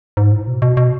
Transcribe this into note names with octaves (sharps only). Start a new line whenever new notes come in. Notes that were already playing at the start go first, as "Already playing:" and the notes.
G#2
A2
B2
B2
B2